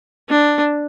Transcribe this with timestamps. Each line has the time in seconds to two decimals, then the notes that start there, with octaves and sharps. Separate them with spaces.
0.30 D4